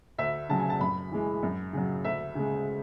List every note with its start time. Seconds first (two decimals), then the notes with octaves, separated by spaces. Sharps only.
0.18 D2 E5
0.49 C#3 F#3 A5
0.60 G#5
0.70 A5
0.80 F#2 B5
1.12 E3 G#3
1.43 F#2
1.73 C#3 F#3
2.04 D2 E5
2.35 C#3 G#3